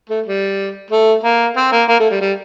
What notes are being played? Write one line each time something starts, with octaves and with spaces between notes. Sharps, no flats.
A3
G3
A3
A#3
C4
A#3
A#3
A3
G3
G3